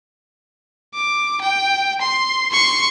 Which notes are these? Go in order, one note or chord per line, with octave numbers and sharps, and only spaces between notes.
D6
G5
C6
C6 C#6